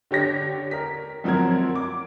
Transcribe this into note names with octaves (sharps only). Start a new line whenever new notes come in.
D3 G4 C#5 A#6 B6
A#4 B6
F#2 F3 C4 F#4 A#4 G#6
D6